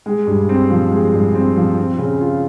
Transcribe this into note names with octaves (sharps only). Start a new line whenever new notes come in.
G#3
G2
C4
F3
G#3
G2
C4
F3
C4
C#3
F4